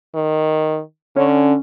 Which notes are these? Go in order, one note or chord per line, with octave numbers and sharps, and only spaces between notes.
D#3
D3 C#4